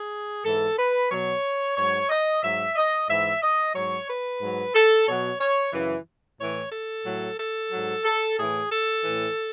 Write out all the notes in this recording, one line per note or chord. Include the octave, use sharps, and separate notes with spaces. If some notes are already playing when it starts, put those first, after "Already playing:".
Already playing: G#4
G#2 E3 A4
B4
B2 F#3 C#5
G#2 F#3 C#5
D#5
G#2 F#3 E5
D#5
G#2 E3 E5
D#5
G#2 F#3 C#5
B4
G#2 F#3
A4
B2 F#3 C#5
C#5
F#2 C#3 E3
A2 E3 C#5
A4
A2 F#3
A4
G#2 F#3
A4
A2 E3 G#4
A4
A2 E3